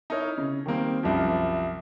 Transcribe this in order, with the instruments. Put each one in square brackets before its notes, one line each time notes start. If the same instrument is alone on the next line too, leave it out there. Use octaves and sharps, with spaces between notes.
[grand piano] D#4 E4 A#4 C#5
C#3
D#3 G3 A#3 C4
C2 F#2 F3